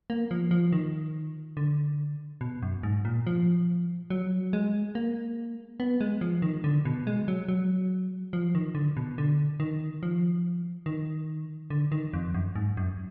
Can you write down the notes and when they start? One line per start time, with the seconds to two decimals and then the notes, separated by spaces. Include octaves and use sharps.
0.10 A#3
0.31 F3
0.51 F3
0.73 D#3
1.57 D3
2.41 B2
2.63 F#2
2.83 G#2
3.05 A#2
3.27 F3
4.10 F#3
4.53 G#3
4.95 A#3
5.80 B3
6.01 G#3
6.21 F3
6.42 D#3
6.64 D3
6.85 B2
7.07 G#3
7.28 F#3
7.48 F#3
8.33 F3
8.55 D#3
8.75 D3
8.97 B2
9.18 D3
9.60 D#3
10.03 F3
10.86 D#3
11.70 D3
11.92 D#3
12.13 F2
12.34 F#2
12.55 G#2
12.77 F#2